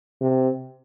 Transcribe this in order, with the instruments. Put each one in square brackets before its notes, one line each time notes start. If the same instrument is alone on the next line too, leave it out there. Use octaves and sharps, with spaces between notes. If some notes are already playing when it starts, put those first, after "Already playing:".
[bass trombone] C3